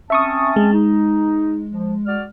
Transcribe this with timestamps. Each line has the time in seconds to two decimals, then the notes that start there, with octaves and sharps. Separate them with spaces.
0.10 C4 C#4 E5 A5 C#6 D#6
0.56 G#3
0.72 D#4
1.71 F3
2.06 F#4 D5 F6